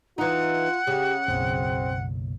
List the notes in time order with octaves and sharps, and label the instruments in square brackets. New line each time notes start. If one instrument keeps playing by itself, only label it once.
[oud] E3 D#4 [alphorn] F4 [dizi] F#5
[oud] C#3 [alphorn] G4
[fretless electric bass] F#1 B1 [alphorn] C4